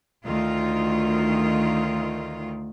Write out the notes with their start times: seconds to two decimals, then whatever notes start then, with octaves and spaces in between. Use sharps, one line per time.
0.25 D2 D#3 F4